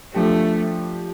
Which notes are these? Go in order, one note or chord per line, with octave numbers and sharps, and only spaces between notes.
F3 A3 D4 G4